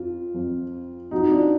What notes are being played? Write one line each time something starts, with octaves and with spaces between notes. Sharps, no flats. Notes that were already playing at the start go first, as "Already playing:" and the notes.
Already playing: F2 F3 F4
F2 F3
F2 F3 D#4 F#4
D4 F4